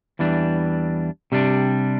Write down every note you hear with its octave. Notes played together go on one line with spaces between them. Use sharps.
E2 E3 G3 D4
C3 G3 D4